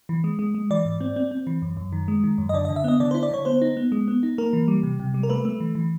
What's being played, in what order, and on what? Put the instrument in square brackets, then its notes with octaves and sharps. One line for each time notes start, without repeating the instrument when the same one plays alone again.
[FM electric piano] E3
G#3
G#3
G#3
E3 D5
G#2
C4
C4
C4
E3
F#2
F#2
D#3
G#3
D#3
F#2
D#5
D3 D5
D#5
D3
E5
B3 D#5
D3 D5
C5
E4
D5
D3 C#5
B3 C5
D#4
B3
G#3
B3
D#4
A#3 A#4
E3
G3
C3
C3
G3
A#4
A3 B4
A3
E3
E3